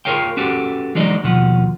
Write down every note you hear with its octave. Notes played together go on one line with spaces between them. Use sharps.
F4 G#4 A#4 C#5 F5 G5
C#4 F#4 G4 A4 B4
E3 F#3 G#3 D#4 D5 D#5
D#2 B2 F3 F4 F#5